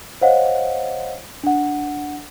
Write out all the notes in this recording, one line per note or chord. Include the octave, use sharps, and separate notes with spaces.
C5 C#5 D#5 F5 F#5
D4 F#5